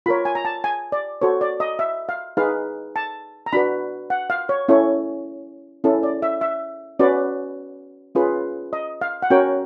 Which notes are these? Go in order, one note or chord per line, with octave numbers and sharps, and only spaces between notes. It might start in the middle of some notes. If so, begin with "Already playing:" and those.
F4 A#4 C#5 B5
G#5
A#5
A5
G#5
D5
F#4 A4 C5 C#5
D5
D#5
E5
F5
D#4 G#4 B4 F5
A5
A#5
D4 F#4 B4 B5
F#5
F5
C#5
C#4 E4 A4 C#5
C#4 E4 A4
D5
E5
E5
C#4 F#4 B4 D5
C#4 F4 G#4 B4
D#5
F5
F#5
C#4 F#4 A#4 C#5 G5